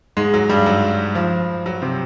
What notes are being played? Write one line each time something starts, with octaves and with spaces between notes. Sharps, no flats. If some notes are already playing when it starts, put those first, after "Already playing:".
G#2 G#3
F#3
G2 G3
F#3
F3
F#3
C3 C4